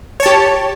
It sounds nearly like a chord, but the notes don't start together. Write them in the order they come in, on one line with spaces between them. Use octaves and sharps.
C#5 A5 G4